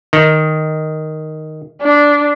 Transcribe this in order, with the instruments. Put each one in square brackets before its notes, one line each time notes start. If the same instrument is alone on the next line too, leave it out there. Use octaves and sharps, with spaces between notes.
[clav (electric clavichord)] D#3
[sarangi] D4